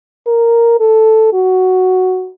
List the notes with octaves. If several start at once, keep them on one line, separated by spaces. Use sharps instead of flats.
A#4
A4
F#4